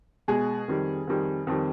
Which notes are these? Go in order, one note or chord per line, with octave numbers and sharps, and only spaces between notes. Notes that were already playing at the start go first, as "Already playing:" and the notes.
B2 G#3 G#4
F2 D#3 G3
F2 D#3 G3
F2 D#3 G3